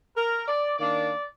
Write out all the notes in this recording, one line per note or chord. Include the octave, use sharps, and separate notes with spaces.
A#4
D5
D#3 A#3 D4 D5